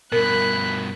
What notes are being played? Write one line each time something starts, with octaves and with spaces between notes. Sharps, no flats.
G2 B2 A#4 B5 F#6